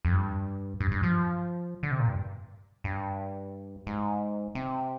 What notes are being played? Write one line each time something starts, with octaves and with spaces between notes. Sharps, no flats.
F2
G2
G2
G2
F3
D3
C3
A#2
G2
G2
G#2
C3